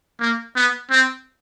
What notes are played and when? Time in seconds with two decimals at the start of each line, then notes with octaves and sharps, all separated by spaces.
0.20 A#3
0.56 B3
0.91 C4